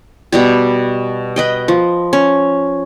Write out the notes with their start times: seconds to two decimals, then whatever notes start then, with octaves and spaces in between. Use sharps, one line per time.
0.32 B2 G3 G4
1.36 B4 D#5 G5
1.68 F3
2.13 C#4